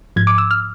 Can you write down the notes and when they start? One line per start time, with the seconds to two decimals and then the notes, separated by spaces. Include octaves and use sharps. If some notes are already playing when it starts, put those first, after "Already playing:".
0.16 G#2 F3 G#6
0.27 D6
0.38 E6
0.51 F6